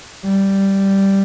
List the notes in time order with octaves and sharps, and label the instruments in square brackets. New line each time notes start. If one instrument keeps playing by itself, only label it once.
[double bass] G3